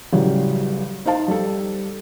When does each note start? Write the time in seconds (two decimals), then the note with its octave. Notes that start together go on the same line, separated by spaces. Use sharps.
0.13 A1 C#3 F#3 G3
1.06 D#4 C5 F5 A5
1.28 G3 A4